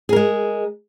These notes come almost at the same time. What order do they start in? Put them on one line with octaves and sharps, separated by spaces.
G#4 A#4 G#3